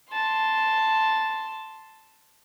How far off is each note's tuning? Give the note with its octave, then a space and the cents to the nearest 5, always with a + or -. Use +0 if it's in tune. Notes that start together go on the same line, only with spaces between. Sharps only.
A5 +0 C6 +0